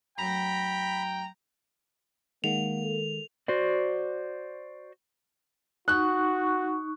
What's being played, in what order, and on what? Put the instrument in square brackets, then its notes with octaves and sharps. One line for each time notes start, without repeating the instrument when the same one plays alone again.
[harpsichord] F#2 F#3 A3 [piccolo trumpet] G5 [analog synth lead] A#5 [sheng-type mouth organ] B5
[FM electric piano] D#3 G#3 [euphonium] A#3 [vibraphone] G#4 F#5 [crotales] F7
[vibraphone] A4 A#4
[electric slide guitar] F#4 C5 D5
[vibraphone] D#4 C#6 [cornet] F#4 [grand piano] F#6